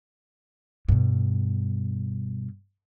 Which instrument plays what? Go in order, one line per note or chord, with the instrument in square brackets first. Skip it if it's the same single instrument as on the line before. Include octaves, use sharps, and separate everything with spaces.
[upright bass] G2 B2